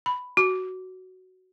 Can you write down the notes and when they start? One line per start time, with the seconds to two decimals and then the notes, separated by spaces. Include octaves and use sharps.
0.06 B5
0.37 F#4